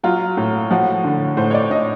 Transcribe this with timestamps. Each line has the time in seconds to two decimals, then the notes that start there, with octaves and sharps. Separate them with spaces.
0.04 F#3 F4
0.37 A2
0.71 F3 F#4
1.04 D3
1.37 A2 C5
1.51 C#5
1.54 D5
1.71 A2 D#5